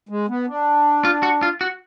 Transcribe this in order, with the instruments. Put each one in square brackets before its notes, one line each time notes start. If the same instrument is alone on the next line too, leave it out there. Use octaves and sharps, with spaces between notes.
[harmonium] G#3
B3
D4
[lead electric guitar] F4
F#4
F4
F#4